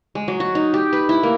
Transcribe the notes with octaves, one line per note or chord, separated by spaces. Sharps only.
G#3
F#3
F#4
D#4
G4
B4
E4
A#3